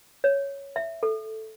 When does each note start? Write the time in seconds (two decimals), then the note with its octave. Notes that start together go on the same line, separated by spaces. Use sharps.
0.24 C#5
0.76 E5
1.03 A4